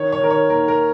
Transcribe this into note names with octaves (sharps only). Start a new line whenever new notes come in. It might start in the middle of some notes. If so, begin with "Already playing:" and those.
Already playing: D#3 C#5
C#5
D#3 A#4
C#5
D#2 A#4
A#4